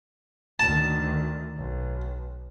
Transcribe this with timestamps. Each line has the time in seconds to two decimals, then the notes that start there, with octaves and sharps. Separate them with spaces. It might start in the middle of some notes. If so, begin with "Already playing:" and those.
0.59 D2 D#3 A5
1.56 B1